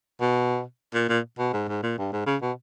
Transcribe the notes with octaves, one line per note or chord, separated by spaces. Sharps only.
B2
A#2
A#2
B2
G#2
G#2
A#2
G2
G#2
C#3
B2